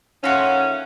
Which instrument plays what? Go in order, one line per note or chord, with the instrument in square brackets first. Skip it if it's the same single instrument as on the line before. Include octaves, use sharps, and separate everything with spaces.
[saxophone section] D#3 A3 C#4 [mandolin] F4 F#4